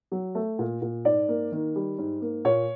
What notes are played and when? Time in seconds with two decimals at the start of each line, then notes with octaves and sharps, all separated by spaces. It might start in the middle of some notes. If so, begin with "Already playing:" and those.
0.12 F#3
0.35 A3
0.59 A#2
0.82 A#2
1.05 G#2 D5
1.28 A#3
1.52 D#3
1.75 G3
1.98 G#2
2.21 A#3
2.45 A#2 C#5